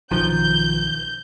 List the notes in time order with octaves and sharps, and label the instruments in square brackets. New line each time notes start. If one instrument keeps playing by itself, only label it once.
[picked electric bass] B1 D#3 F3 [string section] G6